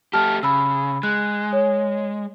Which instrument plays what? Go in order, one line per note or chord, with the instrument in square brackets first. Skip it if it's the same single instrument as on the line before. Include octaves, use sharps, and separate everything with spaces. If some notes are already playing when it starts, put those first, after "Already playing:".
[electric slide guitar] A3 G4 [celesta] A5 F6
[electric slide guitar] C#3 [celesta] B5 E6
[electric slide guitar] G#3 [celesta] F#6
[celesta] C#5